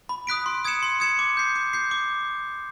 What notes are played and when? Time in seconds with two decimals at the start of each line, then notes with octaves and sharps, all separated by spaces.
0.09 B5
0.27 D#6 F#6 B6 D7
0.46 C6
0.64 D#6 G#6 C#7 E7
0.82 C6
1.00 D#6 G#6 C#7 E7
1.19 D6
1.37 G6 C7
1.55 D6
1.73 G6 C7
1.91 D6